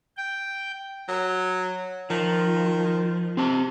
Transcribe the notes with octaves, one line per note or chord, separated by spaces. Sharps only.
G5
F#3
D#3 F3
C3 C4 A5